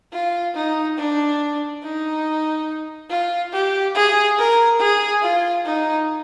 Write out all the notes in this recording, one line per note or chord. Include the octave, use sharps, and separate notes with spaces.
F4
D#4
D4
D#4
F4
G4
G#4
A#4
G#4
F4
D#4